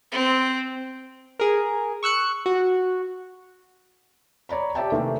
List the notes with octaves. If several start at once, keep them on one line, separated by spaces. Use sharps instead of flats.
C4
G#4 A#4
C#6 E6 F#6 C#7
F#4
C#5 D5 A#5 B5
G4 C#5 D5 E5 G5 A5
C3 D#3 E3 A3 A#3